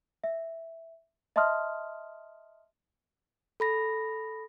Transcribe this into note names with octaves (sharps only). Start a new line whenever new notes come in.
E5
D#5 E5 A5 C6 D#6 F6
A4 B5 A#6